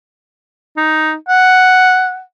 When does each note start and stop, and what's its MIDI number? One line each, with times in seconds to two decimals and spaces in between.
0.77 1.14 63
1.29 2.21 78